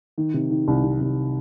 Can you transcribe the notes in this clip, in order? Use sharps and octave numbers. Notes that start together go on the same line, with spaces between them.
D#3
C3
D#3
C2
C3
C2